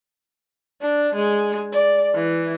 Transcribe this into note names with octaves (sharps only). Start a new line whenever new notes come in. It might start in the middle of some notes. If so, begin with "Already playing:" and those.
D4
G#3
D5
E3